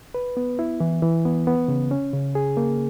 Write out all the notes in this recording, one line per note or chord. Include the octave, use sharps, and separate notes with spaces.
B4
B3
E4
E3
E3
B3
B3
C#3
C#4
C#3
G#4
A#3